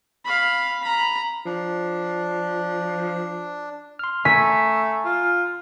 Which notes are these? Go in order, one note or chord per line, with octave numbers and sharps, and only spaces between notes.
F5 B5
A#5 B5
F3 D4
C6 F6
A3 G#5 A#5 B6
F4